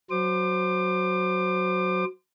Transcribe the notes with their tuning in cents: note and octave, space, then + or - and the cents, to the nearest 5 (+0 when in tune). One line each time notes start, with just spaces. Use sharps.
F#3 +0 C5 -15 D6 +30